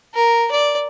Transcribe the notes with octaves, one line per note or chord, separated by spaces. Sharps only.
A#4
D5